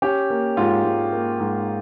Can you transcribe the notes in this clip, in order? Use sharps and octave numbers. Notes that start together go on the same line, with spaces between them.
C#4 G4
A#3
G#2 F4
G#2
A#3
G#2